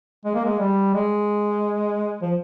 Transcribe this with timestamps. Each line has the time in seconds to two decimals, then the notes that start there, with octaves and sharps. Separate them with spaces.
0.25 G#3
0.35 A#3
0.45 G#3
0.59 G3
0.94 G#3
2.22 F3